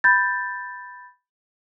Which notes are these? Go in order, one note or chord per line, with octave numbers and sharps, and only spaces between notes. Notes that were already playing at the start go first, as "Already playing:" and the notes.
B5 G6 A6